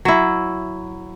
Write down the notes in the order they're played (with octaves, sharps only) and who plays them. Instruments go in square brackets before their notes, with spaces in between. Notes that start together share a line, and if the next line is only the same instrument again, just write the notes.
[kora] F#3 E4